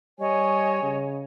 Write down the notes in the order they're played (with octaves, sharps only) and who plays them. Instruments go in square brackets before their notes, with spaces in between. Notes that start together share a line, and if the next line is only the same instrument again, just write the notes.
[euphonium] G3 [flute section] C#5 D#5 G#5
[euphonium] C#3